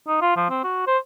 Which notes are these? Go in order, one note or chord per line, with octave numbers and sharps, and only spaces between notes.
D#4
F4
F3
C4
F#4
C5